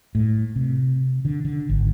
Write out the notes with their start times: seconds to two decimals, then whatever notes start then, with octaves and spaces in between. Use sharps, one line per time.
0.15 A2
0.56 C3
1.25 D3
1.45 D3
1.69 G#1